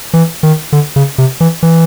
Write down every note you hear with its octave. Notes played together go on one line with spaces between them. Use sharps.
E3
D#3
D3
C#3
C3
E3
E3